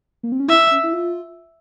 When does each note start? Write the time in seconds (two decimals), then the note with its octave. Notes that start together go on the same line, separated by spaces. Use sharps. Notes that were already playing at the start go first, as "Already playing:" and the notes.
0.23 A#3
0.32 C4
0.40 C#4
0.48 E4 E5
0.71 C#4
0.83 E4
0.93 F4